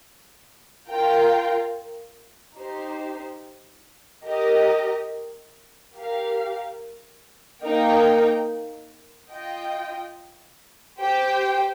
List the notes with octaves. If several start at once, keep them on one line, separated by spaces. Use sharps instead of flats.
F4 A#4 G5
D#4 G4 C5
G4 A#4 D#5
G4 A#4 F5
A#3 D#4 A#4 G5
F4 D#5 G5
G4 C5 G5